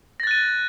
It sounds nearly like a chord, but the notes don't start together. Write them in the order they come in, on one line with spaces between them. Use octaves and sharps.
A#6 A6 F#6 D#7